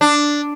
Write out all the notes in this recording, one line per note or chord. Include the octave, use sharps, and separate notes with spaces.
D4